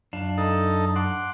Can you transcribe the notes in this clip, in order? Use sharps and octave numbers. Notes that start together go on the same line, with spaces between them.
F#2 D4 F5
D#4 A4
F#5 C6 D6